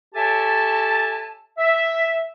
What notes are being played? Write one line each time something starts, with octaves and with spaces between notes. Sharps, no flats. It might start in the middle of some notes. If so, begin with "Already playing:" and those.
G4 A4 C#5 E5 G#5 A5
E5